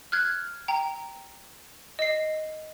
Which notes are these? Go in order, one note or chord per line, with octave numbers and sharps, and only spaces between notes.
F6 F#6 G#6
G5 A#5
D#5 C7